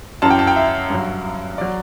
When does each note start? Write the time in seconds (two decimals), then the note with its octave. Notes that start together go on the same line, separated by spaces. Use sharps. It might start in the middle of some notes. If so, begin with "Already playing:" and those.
0.22 F#2 E3 A5
0.30 G5
0.39 A5
0.47 G5
0.56 E5
0.90 G2 F#3
1.58 F#3 D5